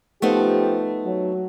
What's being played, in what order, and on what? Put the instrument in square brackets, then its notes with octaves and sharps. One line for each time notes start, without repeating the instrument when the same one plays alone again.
[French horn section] F3 G4 [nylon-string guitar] A3 B3 D#4
[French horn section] F#3